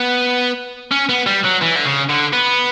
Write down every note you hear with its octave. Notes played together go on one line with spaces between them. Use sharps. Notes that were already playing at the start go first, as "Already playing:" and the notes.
Already playing: B3
C#4
B3
G3
F#3
E3
D3
C#3
D3
B3